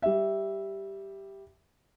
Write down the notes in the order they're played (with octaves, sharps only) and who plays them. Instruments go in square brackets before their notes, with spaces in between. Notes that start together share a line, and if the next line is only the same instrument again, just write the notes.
[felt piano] G3 E5